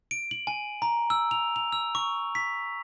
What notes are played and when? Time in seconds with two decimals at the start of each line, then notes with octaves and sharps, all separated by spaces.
0.11 D7
0.31 F#7
0.47 G#5
0.82 A#5
1.10 E6
1.31 F7
1.56 F7
1.73 E6
1.95 C#6
2.35 B6